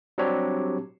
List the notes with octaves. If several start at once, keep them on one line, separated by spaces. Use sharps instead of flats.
F#3 G3 C4 D4 G4 C#5